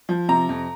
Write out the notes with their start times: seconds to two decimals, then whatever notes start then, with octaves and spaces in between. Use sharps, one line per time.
0.09 F3
0.29 C3 A#5
0.49 F2